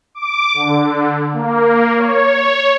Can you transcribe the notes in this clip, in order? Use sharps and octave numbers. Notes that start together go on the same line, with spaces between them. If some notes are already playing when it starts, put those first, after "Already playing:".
D6
D3
A#3
C#5